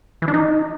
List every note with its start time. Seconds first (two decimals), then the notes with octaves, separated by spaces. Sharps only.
0.22 E3
0.28 D4
0.34 D#4